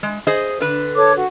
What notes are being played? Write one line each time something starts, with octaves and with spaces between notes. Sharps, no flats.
G#3
G#4 C5 D#5
D3 B4
A4 C#5 D6
F#4